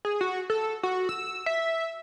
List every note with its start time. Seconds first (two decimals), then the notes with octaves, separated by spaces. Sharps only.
0.05 G#4
0.21 F#4
0.50 A4
0.83 F#4
1.09 E6
1.46 E5